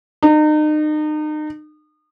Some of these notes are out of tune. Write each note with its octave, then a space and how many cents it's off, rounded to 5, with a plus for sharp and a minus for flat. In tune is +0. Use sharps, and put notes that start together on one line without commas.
D#4 -35